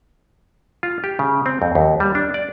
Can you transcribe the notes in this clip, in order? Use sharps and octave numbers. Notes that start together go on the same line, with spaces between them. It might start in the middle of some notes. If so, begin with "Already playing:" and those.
F4
G4
C#3
C4
F2
D#2
G3
D4
D5